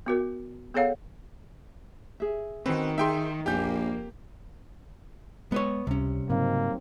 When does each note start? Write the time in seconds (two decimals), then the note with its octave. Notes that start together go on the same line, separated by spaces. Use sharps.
0.06 B3 F#4 A#4
0.74 B3 G#4 A4 C#5 F5 F#5
2.20 G#4 E5
2.66 D#3 C4 C#4 F#4 B4
2.98 D#4 G#4 E5 G5 C6
3.46 A#1 F2 A#3 G4 G#5 G6
5.52 G#3 B3 B4 C#5
5.87 C#2 C3 G3 C#4
6.30 G#2 C#3 F#3 A#3 C4 D#4